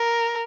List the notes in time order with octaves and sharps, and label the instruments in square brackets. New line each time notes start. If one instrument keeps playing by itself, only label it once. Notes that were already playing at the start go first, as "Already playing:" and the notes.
Already playing: [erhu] A#4